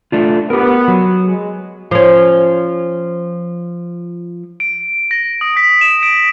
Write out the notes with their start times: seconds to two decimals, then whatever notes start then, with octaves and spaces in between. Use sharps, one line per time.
0.12 A3 D4 F4
0.50 B3 G4 A#4
0.88 F#3
1.25 G#3
1.91 F3 C#4
4.60 D7
5.11 A#6
5.41 D#6
5.57 B6
5.81 E7
6.03 D7